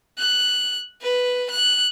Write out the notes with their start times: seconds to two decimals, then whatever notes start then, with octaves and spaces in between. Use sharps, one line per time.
0.18 F#6
1.02 B4
1.51 F#6